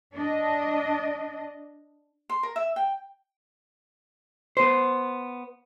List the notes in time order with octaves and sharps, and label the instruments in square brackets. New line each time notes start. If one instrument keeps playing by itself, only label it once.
[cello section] D4 D#5
[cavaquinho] C6
A#4
E5
G5
[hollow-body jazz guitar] B3 C5